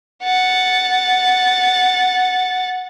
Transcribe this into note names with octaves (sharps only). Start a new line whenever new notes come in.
F#5 A6